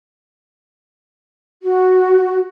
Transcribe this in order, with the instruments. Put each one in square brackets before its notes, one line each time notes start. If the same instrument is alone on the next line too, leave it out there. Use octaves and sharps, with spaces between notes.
[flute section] F#4